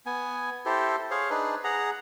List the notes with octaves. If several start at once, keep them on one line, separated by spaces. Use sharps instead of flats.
B3 G#5
E4 G4 A4 C5
G#4 C5 C#5 F5
D4 D#4 G#4 B4
G#4 F#5 A#5